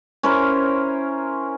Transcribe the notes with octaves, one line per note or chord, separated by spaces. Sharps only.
C#4 E4 A#4 C5